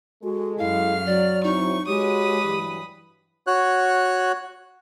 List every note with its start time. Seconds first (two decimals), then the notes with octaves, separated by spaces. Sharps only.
0.23 G#3 F#4 A4
0.59 F#2 E4 F5 F6
1.06 F#3 D5
1.44 C4 D#4 E4 C#6
1.87 G#3 F#4 G4 B4 C#5 D#6
2.43 G2 E3 F#3
3.47 F#4 C#5 F#6